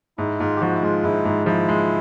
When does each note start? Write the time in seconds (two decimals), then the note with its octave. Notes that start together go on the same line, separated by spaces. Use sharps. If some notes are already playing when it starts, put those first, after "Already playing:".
0.18 G#2 E4
0.40 G#2 F4
0.56 G4
0.61 F3 F#4
0.75 E4
0.83 G#3 F4
1.03 G#2 E4
1.25 G#2
1.46 F3 E4
1.69 G#3